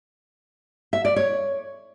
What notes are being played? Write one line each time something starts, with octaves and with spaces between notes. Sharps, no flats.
E5
D5
C#5